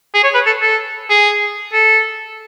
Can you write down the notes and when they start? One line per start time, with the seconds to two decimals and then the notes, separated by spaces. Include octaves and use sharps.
0.14 G#4
0.24 C#5
0.34 B4
0.46 A4
0.62 A4
1.10 G#4
1.73 A4